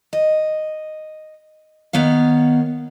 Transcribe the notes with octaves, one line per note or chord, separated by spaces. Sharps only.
D#5
D#3 B3 C#5 F5